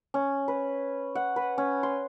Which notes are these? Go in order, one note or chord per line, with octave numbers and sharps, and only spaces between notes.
C#4
B4
F#5
B4
C#4
C6